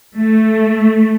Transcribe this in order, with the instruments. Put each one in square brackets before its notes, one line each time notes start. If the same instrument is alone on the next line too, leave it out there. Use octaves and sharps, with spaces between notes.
[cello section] A3